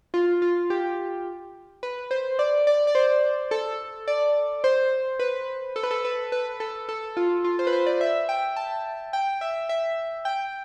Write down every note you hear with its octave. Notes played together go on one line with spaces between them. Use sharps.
F4
F4
G4
B4
C5
D5
D5
D5
C5
A4
D5
C5
B4
A4
B4
A4
B4
B4
A4
A4
F4
F4
C5
B4
C5
D5
E5
G5
A5
G5
E5
E5
G5